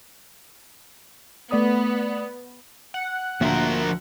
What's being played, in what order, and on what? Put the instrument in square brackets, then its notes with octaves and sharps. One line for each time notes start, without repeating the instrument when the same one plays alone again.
[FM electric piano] A3 D5 D#6 [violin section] B3
[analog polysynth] F#5
[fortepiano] D2 [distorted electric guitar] F3 A#4 [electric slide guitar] A#3 E5 F5